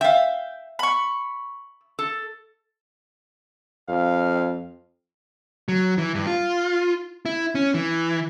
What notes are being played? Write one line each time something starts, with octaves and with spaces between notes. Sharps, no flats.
E5 F5 G5
B5 C#6
A4
F2 F5
F#3
E3
G2
F4
E4
C#4
E3